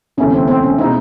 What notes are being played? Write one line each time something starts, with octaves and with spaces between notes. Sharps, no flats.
E1 D2 C3 E3 A3 C#4
C4
C4
C#4
B2 G#3 C4 D#4 E4